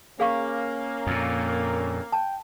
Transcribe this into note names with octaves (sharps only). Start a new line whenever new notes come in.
A#3 C#4 G#4 F5 C#6
F2 A#2
G5 A5